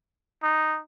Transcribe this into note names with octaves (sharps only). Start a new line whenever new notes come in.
D#4